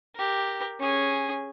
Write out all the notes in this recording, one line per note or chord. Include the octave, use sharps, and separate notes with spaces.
G4 A#4
C#4 G#4